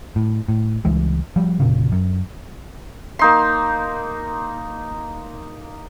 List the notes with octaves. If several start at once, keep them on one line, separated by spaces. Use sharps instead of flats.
A2
A2
C#2 E3 G3 G#3
F3 G3
F1 A#2 C#3
F#2
A#3 D#4 C6